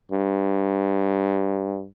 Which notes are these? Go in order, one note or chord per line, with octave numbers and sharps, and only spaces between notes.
G2